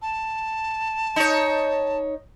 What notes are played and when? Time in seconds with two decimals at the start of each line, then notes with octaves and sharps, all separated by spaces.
0.02 A5
1.16 D#4 C#5